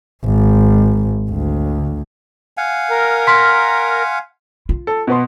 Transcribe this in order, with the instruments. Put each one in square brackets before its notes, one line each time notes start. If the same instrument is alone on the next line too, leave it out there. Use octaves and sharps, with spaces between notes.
[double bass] G#1
D2
[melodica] F5 F#5 G#5
[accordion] A#4
[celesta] C6 F6 B6
[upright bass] F4
[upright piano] A4
B2 B3 C6